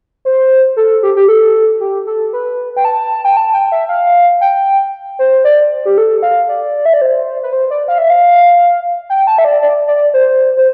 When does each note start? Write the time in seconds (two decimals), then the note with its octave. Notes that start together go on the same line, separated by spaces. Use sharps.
0.25 C5
0.77 A4
1.03 G4
1.16 G4
1.28 A4
1.80 G4
2.07 A4
2.33 B4
2.77 G5
2.85 A5
3.25 G5
3.37 A5
3.54 G5
3.72 E5
3.89 F5
4.41 G5
5.19 C5
5.44 D5
5.85 G4
5.98 A4
6.23 F5
6.49 D5
6.86 E5
6.93 D5
7.02 C5
7.43 B4
7.53 C5
7.71 D5
7.88 F5
7.98 E5
8.10 F5
9.10 G5
9.27 A5
9.38 E5
9.45 D5
9.62 D5
9.88 D5
10.14 C5
10.57 C5